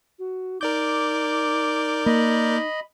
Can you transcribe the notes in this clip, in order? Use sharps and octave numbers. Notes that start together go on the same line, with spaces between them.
F#4
D#4 A#4 D5 D6 G6
A#3 D#5 B5